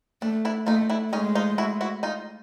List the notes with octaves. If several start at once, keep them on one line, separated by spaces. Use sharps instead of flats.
A3 D4
D4 E4
A3 D#4 F4
D4 E4
G#3 C#4 D#4
D#4 F4
E4 F#4
E4 F#4
D#4 F4